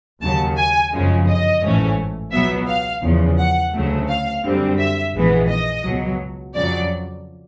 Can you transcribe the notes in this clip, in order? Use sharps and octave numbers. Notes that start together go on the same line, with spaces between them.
D#2 C#3 F#3 A5
G#5
G1 F#2 C#3 F3 G#3
D#5
A1 G#2 E3 A3 C#4
C#2 B2 F#3 B3 E5
F5
E2 C#3 F3
F#5
D2 C#3 F#3 A3
F5
F#2 D3 G3 C4
E5
A#1 G#2 E3 G#3 B3
D#5
C#2 B2 F#3
F2 C#3 F#3 D5